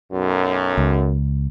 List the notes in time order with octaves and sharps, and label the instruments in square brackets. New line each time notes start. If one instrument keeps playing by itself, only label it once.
[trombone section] B1 F#2
[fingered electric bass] C#2